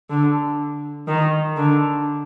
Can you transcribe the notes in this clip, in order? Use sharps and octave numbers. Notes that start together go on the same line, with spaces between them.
D3
D#3
D3